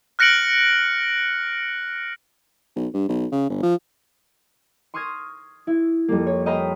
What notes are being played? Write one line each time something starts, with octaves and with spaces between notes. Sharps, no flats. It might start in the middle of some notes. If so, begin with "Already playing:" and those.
F6 F#6 A#6 C#7 D7 F#7
B1
G2
B1
C#3
G1
F3
C6 C#6 D#6 F6 G#6 A#6
E4
F2 G3 A#3
C#5
C#5 D#5 F5 G5 A#5 B5